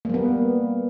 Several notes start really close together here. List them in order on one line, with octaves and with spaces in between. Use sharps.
A#3 G3 B3